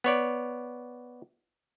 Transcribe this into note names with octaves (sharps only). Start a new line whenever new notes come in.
B3 C#5 D5